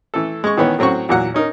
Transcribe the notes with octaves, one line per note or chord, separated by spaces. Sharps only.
E3 A3 A4
G#3 C#6
D#3 E3 B3 C#4
A2 F#3 C4 F#4 C#6
E2 A#2 F#3 F#5
C#4 D#4 A#4